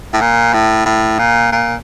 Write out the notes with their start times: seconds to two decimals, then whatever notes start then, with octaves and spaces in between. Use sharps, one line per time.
0.13 A2
0.21 A#2
0.54 A2
0.86 A2
1.19 A#2
1.52 A#2